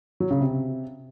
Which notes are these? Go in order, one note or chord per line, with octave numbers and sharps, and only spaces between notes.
F#3
C#3
C3